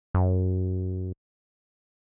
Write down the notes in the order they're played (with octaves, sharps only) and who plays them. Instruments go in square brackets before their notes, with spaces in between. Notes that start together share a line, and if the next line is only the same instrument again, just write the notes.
[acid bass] F#2